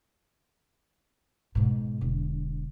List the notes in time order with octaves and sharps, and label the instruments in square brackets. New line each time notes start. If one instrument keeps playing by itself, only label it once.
[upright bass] G#2 B2
E1 D3